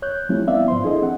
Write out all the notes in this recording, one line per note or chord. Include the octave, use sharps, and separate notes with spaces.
C#5 F#6 G6
F3 G3 A3 C4 C#4 E4
B3 C4 E4 D5 E5 F5
G#2 F3 C5 C6
D4 E4 G#4 A4 C5 D#5
C4 F#5